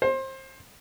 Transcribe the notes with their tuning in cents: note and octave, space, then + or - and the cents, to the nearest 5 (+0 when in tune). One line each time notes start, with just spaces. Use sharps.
C5 +25